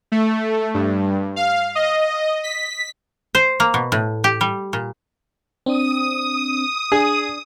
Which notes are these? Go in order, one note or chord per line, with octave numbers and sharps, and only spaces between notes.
A3
G2
F5
D#5
B6
C5
A#3
B2
A2
G4
G3
A#2
C4 D4 D#6
D4 G#4